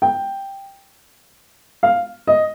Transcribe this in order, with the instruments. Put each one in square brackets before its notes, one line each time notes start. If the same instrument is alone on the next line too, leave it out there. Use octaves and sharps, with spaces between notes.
[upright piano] G5
F5
D#5